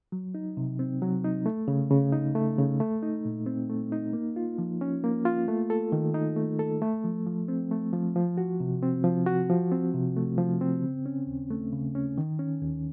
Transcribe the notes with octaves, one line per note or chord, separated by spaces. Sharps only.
F#3
D#4
C3
C4
F#3
D#4
A3
C#3
C#3
D#4
A3
C#3
A3
D#4
A#2
C4
A3
D#4
A#3
F4
F3
C#4
A#3
F4
A3
A4
D#3
D#4
A3
A4
A3
F3
F3
C4
A3
F3
F3
F#4
C3
C4
F3
F#4
F3
C4
C3
A3
F3
C4
C#3
C#4
D#2
A3
C#3
C#4
D#3
C#4
D#2